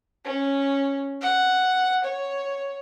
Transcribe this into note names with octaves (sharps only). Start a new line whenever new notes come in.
C#4
F#5
C#5